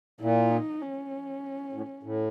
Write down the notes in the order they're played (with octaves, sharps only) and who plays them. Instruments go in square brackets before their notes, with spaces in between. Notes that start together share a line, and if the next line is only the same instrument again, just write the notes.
[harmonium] A#2 [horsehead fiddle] E4
[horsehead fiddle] D#4
C#4
[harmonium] A2
A2